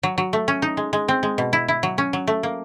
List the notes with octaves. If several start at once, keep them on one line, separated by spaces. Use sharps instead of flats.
F#3
F#3
A3
C#4
D#4
G#3
G#3
C4
G#3
B2
E4
E4
F#3
C#4
F#3
A3
A#3